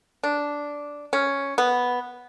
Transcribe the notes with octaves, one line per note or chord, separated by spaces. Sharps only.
D4
C#4
B3